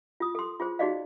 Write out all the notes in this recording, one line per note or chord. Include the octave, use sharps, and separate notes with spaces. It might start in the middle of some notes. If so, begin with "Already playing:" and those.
F4 D#6
A4 C6
F4 G#4 C5
D#4 F#4 G#4 D5 D#5 F5